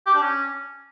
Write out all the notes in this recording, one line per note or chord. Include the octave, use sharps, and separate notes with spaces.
G4
D4
C#4